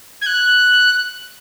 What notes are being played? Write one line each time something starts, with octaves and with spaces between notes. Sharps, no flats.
G#6
F#6